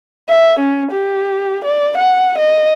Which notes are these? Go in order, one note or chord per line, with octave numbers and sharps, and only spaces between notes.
E5
C#4
G4
D5
F#5
D#5